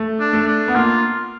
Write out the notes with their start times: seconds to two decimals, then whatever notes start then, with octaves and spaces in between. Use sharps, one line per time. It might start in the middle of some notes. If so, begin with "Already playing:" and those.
Already playing: A3
0.20 D4
0.33 A3
0.47 D4
0.68 B3
0.75 A#3 F4